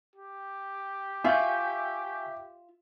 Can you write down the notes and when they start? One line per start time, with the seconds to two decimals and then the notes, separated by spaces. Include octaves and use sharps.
0.16 G4
1.24 F4 E5 G#5 C#6 G6